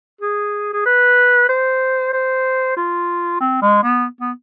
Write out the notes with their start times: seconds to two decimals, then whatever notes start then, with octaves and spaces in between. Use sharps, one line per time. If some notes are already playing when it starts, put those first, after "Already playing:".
0.21 G#4
0.73 G#4
0.85 B4
1.49 C5
2.13 C5
2.77 F4
3.40 C4
3.62 G#3
3.83 B3
4.20 B3